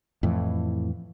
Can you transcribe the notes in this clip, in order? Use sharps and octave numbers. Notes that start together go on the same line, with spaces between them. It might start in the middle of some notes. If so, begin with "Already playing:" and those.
F2 A2 E3